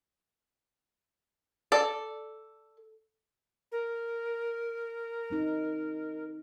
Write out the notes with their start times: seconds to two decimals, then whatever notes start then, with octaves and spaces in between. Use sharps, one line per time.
1.72 A4 D5
3.72 A#4
5.30 A3 C4 D#4